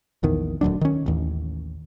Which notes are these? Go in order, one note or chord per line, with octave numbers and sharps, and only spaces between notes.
A#1 E2 D#3
D#1 D2 F#3 D4
D#3 C#4
A1 D#2